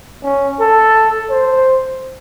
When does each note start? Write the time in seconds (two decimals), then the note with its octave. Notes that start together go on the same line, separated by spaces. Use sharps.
0.23 C#4
0.60 A4
1.30 C5